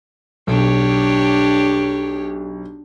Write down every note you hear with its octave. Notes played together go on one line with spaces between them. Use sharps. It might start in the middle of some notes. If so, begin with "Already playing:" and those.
B1 D4 G4 C#5